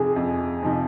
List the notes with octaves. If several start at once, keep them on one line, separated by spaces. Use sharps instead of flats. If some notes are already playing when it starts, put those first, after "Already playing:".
Already playing: F2 C3 F3 C4 D#4 G#4
F2
C3 F3 C4 D#4